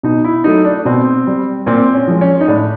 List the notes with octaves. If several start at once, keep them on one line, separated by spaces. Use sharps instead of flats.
B2 D#4
E4
F#3 A3 D#4
D4
B2 C4
G3
A#2 C4
C#4
F3 G#3
C#4
D#4
A2 D4